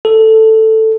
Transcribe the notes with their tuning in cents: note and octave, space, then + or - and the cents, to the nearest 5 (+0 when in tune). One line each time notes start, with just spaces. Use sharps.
A4 +5